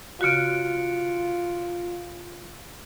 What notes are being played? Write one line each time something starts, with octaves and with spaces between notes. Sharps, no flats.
C#3 F4 F#4 F#6 C#7 D7